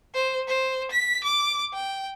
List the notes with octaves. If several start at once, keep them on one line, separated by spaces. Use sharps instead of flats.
C5
C5
B6
D6
G5